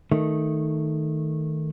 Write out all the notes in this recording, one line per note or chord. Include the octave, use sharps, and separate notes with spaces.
D#3 A3